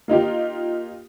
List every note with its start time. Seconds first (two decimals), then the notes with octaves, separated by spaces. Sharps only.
0.08 A#3 D#4 F4 G4